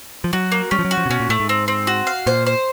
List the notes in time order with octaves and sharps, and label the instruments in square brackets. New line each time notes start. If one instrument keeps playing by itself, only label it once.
[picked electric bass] F3
[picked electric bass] F#3 [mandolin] F#4
[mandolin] A#3
[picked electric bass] G3 [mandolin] C#4
[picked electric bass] F3
F#3
[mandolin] F#4
[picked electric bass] F3
C3
[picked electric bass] B2 [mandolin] C#4
[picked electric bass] A#2
[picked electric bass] A2 [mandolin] A3
[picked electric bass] G#2
[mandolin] C4
C4
F#4
F5
[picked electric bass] A#2 [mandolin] C5
[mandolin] C5